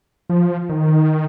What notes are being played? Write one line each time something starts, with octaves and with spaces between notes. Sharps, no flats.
F3
D#3